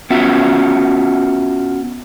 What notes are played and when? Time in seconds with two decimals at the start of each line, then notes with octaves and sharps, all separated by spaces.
0.10 B3 C#4 F4 F#4 E5